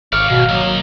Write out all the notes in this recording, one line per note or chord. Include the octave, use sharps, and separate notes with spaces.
G#1 C#5 D5 F5
B2 F#3
F#3 A#3 D#5